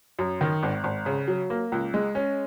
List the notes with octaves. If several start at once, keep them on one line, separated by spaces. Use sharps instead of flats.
F#2
D#3
G#1
G#1
C#3
F#3
A#3
C#2
G#3
C#4